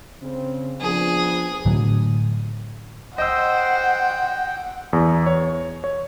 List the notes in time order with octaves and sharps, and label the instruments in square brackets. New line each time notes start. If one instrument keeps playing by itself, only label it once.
[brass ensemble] C#3 C4
[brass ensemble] F3 B3 D4 [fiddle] G#4
[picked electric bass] A2 D3 F#3
[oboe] C5 [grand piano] D#5 E6 [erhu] F#5 [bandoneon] G5
[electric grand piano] E2
C#5
C#5